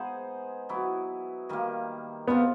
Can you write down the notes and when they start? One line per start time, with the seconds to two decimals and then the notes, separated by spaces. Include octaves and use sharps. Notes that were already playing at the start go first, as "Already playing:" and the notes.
Already playing: G#3 B3 D#4 G#4 C5
0.69 F#3 B3 E4
1.49 D#3 G3 A#3
2.28 G#3 B3 C4 F4